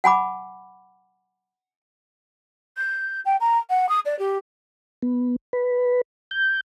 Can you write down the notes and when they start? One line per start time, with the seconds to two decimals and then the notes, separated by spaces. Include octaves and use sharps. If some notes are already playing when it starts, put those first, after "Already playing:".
0.04 F#5 G#5 B5 D6
2.77 G6
3.25 G5
3.40 A#5
3.70 F#5
3.89 D#6
4.06 D5
4.19 G4
5.02 B3
5.53 B4
6.31 G6